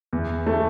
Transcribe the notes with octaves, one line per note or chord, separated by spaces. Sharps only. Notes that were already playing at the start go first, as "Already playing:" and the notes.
E2
A3